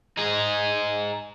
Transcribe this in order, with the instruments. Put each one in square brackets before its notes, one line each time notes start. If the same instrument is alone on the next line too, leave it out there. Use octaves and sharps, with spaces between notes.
[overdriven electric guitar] D#4 G#4